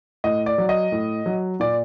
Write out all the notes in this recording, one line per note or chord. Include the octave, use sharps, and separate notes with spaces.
A2 D#5
D5
F#3
D#5
A2
F#3
A#2 D5